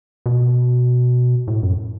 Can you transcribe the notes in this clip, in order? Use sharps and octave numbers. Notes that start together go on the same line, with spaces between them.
B2
A2
F#2